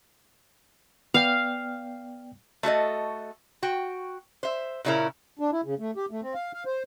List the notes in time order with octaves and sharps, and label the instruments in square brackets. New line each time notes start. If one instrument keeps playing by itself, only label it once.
[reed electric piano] B3 D5 G5 [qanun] F5
[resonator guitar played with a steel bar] A3 F#4 A4 D#5
F#4 G5
C5 E5
A#2 C#3 G3 C#4 E4 A#4
[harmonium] D4
E4
C#3
A3
G4
A3
C4
F5
F5
C5